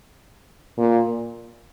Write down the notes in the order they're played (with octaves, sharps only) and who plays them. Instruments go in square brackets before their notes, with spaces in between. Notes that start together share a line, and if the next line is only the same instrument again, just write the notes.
[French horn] A#2